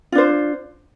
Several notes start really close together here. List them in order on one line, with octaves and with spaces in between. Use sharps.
F4 D4 C5